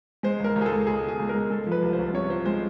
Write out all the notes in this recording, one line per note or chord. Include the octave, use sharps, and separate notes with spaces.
G#3 C5
C#2
A#4
C#2
G#4
A4
C#2
C#2 G#4
B2
G#4
C#2
A#4
G#3
G#3 A4
F3
B4
C2
C5
C2
C3 C#5
F3 C5
G#3 C5